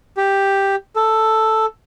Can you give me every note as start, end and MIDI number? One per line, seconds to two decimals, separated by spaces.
0.17 0.76 67
0.96 1.66 69